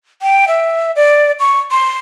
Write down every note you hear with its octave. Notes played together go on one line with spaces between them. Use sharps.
G5
E5
D5
C#6
C6